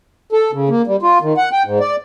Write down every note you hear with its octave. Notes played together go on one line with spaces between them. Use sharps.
A4
C#3
A#3
G3
F4
D#3
F#5
G5
G#2
D5